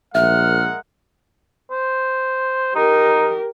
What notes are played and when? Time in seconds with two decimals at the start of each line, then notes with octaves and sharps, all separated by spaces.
0.15 A#1 G#3 A#4 E5 F#5 F6
1.71 C5
2.75 D#4 G4 A#4